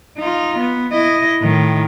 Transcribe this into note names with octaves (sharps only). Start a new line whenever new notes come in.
D#4 F4
B3
E4 D#5
A2 D#3